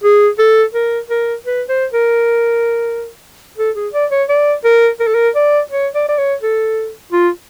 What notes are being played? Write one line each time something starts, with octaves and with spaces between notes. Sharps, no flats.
G#4
A4
A#4
A#4
B4
C5
A#4
A4
G#4
D5
C#5
D5
A#4
A#4
A4
A#4
D5
C#5
D5
D5
C#5
A4
F4